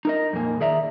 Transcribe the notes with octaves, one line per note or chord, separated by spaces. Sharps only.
D#4 A#4 D#5
F2 A#2 A#3 G#5
D#3 G#4 D5 E5 A#5